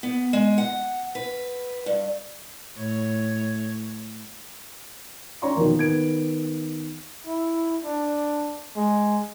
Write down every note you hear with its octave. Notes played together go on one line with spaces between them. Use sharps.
B3
G#3
F#5
B4
G2
A2 C#5
C#4 C#5 D5 A#5 C6 C#6
B2 D#3 F3 A#3
D#3 B3 G#6 D7
E4
D4
G#3